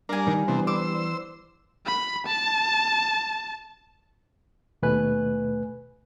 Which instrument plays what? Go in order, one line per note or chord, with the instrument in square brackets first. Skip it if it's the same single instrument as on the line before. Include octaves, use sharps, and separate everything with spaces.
[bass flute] G3 [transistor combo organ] D4 A#4 [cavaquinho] F5 G#5
[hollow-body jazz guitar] D#3
[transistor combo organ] C3 [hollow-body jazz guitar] E3 B3 D4
[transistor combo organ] C5 E6 [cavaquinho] D6
[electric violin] B5
A5
[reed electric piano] D#2 B2 A3 B4 G#5 F#6